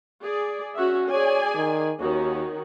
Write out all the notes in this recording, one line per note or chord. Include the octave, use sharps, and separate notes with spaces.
G#4 D5
C#4 F#4 E5
G#4 C#5 D5 G#5
D#3
D#2 D#3 C#4 F#4